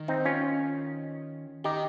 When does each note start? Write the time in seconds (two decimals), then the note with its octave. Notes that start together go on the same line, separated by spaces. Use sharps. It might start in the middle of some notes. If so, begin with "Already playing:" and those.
Already playing: D#3
0.08 C4 D#4
0.25 C#4 F4
1.64 D#3 D#4 G4